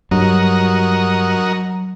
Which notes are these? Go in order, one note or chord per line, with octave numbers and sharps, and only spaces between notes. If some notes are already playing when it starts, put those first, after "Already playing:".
G2 F#3 F#4 A#4 D#5